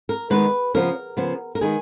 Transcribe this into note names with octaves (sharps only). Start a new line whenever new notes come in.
A#4
D#3 G#3 B3 B4
C#3 F3 B3 A#4
C#3 F3 B3
A#4
D#3 G#3 B3 G#4